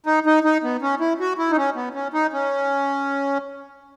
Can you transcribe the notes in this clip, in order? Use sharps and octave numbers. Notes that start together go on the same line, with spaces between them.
D#4
D#4
D#4
B3
C#4
E4
F#4
E4
D#4
C#4
B3
C#4
D#4
C#4